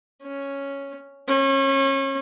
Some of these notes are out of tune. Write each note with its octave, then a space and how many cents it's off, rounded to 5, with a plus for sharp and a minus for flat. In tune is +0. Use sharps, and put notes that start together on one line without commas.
C#4 +0
C#4 -30